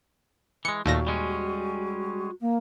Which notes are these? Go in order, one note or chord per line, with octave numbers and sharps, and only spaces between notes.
E3 G#3 C#7
D#2 A#2 A3 F#4 A#6
G3 G#3 C#4
A#3